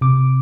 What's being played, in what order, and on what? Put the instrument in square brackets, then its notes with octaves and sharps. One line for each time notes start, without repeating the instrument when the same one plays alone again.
[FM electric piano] C3 D6